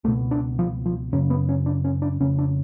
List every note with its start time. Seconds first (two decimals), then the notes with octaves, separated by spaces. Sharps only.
0.04 C#2 A3
0.07 B2
0.31 D4
0.59 F3
0.86 F3
1.13 F#2 C#3 C#4
1.30 B3
1.49 C#4
1.66 D4
1.85 C#4
2.02 D4
2.20 F2 C#3 C#4
2.39 D4